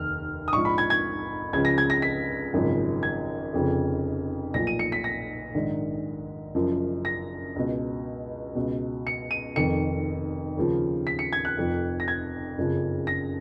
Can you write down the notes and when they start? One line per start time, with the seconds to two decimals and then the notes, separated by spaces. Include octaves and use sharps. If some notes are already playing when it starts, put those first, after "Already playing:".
Already playing: F1 D#2 D#3 F6
0.48 D#6
0.52 A#1 G#2 F3 C#6
0.65 B5
0.78 G#6
0.90 G#6
1.53 C#2 C#3 F3 G#6
1.65 A#6
1.78 G#6
1.90 A#6
2.02 B6
2.54 G#1 F#2 C#3 F3
3.03 G#6
3.53 F1 F2 C#3 F3
4.54 B1 A#2 F3 A#6
4.67 D#7
4.79 C#7
4.92 B6
5.04 A#6
5.55 A#1 G#2 D#3
6.55 F#1 F#2 F3
7.05 A#6
7.56 C#2 B2
8.55 C#2 B2
9.07 C#7
9.31 D#7
9.56 F1 F2 D#3 C#7
10.57 D#2 C#3 F3
11.07 B6
11.19 C#7
11.33 G#6
11.45 F#6
11.57 F1 F2 F3
12.00 A#6
12.08 G#6
12.57 F#1 F2 C#3 F3
13.07 A#6